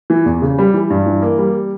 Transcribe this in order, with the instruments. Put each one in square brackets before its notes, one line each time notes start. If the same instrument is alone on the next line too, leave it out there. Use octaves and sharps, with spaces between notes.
[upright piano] E3
E2
C#3
G3
E3
G2
E3
A#3
G3